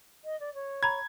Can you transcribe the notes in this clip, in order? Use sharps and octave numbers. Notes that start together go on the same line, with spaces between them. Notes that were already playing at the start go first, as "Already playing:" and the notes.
D#5
D5
C#5
A#5 B5 G#6